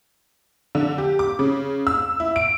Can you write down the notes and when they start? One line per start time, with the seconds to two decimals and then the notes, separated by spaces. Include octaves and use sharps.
0.75 D3
0.98 G4
1.19 D6
1.39 C#3
1.87 E6
2.20 E4
2.36 D7